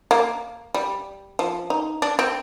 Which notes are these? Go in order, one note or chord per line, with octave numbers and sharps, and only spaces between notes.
A#3
G3
F3
D#4
D4
C4